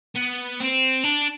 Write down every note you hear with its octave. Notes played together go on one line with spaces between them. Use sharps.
B3
C4
D4